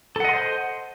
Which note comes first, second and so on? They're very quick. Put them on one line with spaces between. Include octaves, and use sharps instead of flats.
A4 F#5 D#5 C6 C5